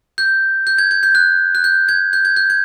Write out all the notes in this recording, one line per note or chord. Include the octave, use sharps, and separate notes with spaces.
G6
G6
G#6
G#6
G6
F#6
F#6
G6
G#6
G6
G#6
G6
G#6